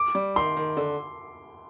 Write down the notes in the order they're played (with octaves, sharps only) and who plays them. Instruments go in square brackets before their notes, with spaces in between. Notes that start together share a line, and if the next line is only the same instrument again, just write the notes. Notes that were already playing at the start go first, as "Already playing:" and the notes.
Already playing: [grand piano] D6
[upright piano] G3
[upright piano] D#3 [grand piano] C6
[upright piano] D#3
D3